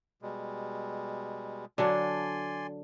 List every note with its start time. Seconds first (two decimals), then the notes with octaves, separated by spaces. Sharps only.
0.22 B2 G3 G#3
1.78 D3 F#3 D4 D5 G#5 C6